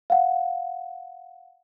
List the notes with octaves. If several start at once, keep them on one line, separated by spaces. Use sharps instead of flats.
F5 F#5